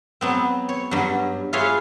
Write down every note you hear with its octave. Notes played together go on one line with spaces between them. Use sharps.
F#3 B3 C4
C#5
G2 F#3
F4 G#4 B4 C#5 E5 F5